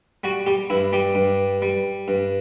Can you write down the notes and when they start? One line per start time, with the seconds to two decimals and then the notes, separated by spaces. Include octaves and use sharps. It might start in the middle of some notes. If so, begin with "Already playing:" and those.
0.24 G3 F#4
0.47 G3 G4
0.70 G2 E4
0.93 G3 G4
1.15 G2
1.62 G3
2.08 G2